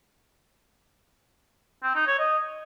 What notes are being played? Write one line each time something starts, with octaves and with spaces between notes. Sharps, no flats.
C4
D#4
C#5
D#5